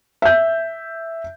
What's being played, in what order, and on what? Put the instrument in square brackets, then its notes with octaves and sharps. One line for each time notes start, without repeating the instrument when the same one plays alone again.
[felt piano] E5 G6